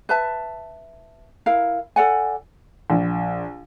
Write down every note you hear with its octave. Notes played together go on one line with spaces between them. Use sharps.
B4 E5 A5
E4 A#4 F5
A4 D5 F#5 G#5
A#1